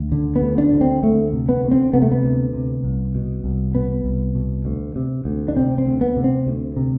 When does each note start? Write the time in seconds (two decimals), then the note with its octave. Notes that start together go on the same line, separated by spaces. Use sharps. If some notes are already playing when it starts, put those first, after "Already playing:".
Already playing: D2
0.12 D3
0.36 B3
0.42 D2
0.58 D4
0.73 D3
0.81 C4
1.03 D2 A3
1.33 C3
1.49 B3
1.63 D2
1.71 C4
1.93 C3 B3
2.02 A3
2.12 B3
2.24 D2
2.53 C3
2.84 C2
3.15 B2
3.44 C2
3.75 B2 B3
4.04 C2
4.35 B2
4.65 D2
4.96 C3
5.25 D2
5.48 D4
5.57 C3 C4
5.78 C4
5.86 D2
6.01 B3
6.16 C3
6.24 C4
6.47 D2
6.77 C3